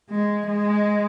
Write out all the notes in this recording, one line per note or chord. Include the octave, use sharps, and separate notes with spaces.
G#3
G#3